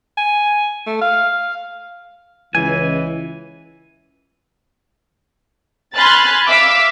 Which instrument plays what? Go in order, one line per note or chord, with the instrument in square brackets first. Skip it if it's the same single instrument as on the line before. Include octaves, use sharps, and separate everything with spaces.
[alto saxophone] G#5
A3
F5
[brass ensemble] C#2 [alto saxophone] E3 [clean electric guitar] G#5
[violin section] G#5 B5 C6 F6 F#6 A6
E5 F5 D6 E6